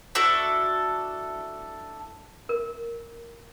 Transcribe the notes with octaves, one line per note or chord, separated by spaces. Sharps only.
D4 E4 F#4 A4
A#4